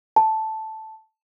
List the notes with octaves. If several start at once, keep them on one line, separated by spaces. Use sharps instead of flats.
A5